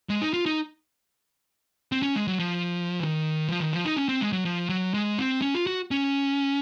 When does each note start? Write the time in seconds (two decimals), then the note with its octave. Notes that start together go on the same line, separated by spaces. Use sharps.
0.09 G#3
0.21 D#4
0.34 F4
0.46 D#4
1.92 C4
2.03 C#4
2.16 G#3
2.28 F#3
2.39 F3
3.00 D#3
3.48 F3
3.60 D#3
3.73 F3
3.85 D#4
3.96 C#4
4.09 C4
4.21 G#3
4.33 F#3
4.45 F3
4.69 F#3
4.94 G#3
5.19 C4
5.42 C#4
5.54 F4
5.67 F#4
5.91 C#4